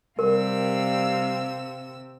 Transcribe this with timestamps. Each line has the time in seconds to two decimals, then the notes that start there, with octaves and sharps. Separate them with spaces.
0.19 C3 G3 A#4 F5 E6